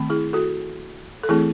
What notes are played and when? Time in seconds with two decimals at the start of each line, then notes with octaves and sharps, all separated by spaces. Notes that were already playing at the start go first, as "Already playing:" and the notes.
Already playing: D#3 A3 C4
0.10 E4 G#4
0.33 F#4 A4
1.23 A4
1.29 E3 A3 C4 E4 G#4